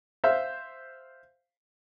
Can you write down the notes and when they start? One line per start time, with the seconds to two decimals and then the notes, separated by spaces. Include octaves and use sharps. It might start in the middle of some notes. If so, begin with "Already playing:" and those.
0.24 C5 E5 F5